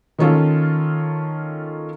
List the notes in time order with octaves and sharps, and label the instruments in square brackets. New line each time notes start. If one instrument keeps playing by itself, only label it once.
[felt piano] D#3 A#3 C#4 F4 A4